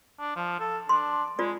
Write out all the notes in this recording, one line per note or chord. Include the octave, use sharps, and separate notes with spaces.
D4
F3
A4
D4 C6
G#3 F4 D5